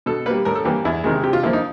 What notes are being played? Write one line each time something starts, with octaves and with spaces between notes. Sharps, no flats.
B2 A4
G3 A#3 B4
A2 A#4
A4
E3 G3 A#3 G4
E2 E4
C3 D#3 G#3
C3 G4
F4
F3 A#3 E4
D#4